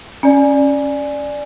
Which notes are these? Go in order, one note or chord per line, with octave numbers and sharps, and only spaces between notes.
C#4 D5 G#5